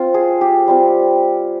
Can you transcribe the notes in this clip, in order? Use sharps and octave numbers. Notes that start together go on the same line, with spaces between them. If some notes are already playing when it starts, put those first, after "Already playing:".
Already playing: C4 F4
G#4
G4
G3 C4 F4